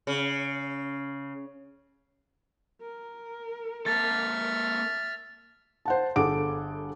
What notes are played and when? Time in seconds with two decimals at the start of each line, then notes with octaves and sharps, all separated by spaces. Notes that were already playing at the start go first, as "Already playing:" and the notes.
0.07 C#3
2.81 A#4
3.86 A#3 A4 E5 F6 A6
5.85 C5 F#5 A5
6.16 G1 G#4 A4 F#5 D6 D7